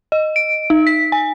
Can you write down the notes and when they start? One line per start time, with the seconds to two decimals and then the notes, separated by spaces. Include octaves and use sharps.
0.12 D#5
0.36 D7
0.70 D#4
0.87 B6
1.12 G#5